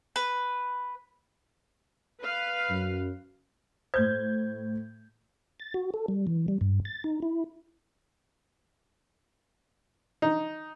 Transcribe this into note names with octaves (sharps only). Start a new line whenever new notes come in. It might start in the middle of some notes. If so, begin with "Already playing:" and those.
B4
B4 F5
F#2
A2 C5 G6 G#6
A6
F#4
A4
G3
E3
G3
G2
A6
D#4
E4
D#4